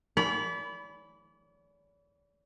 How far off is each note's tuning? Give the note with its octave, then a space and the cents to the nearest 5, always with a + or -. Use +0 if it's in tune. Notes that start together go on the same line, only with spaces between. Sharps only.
D5 -40 B5 +0